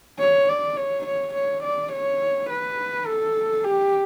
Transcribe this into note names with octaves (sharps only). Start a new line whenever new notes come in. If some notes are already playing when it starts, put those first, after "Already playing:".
C#5
D5
C#5
C#5
C#5
D5
C#5
B4
A4
G4